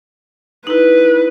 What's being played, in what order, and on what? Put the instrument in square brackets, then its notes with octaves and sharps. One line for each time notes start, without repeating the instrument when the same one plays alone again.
[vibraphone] D#4 E4 [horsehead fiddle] B4